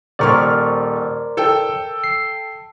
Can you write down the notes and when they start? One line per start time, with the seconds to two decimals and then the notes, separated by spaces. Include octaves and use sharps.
0.19 D#1 A#4 C5 D5 C#6 F6
1.37 A4 G5
2.04 C7